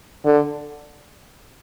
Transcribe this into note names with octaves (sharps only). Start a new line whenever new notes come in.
D3